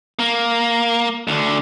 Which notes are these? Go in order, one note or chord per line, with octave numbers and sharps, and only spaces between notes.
A#3
D2 D3